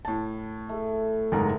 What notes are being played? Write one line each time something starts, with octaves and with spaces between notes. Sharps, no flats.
A2 A5
A3
F#1 G#2 A#5